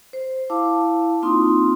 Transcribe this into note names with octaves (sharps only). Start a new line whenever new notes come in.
C5
E4 F5 A5 D6
A#3 C4 D#4 F4 C6 D#6